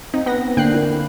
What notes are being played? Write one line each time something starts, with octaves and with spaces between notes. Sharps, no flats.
C4 D#4
B3 F#5 A#6
D3 A#3 D4 G5 F#6 C7
E4 A#4